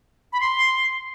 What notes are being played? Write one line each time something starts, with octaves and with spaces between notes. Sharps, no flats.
B5
C6